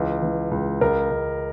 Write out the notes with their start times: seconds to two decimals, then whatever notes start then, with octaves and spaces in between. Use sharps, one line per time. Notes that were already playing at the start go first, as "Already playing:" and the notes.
Already playing: C#2 E3
0.22 E3
0.51 C#2
0.81 C#2 A#4
1.11 C#2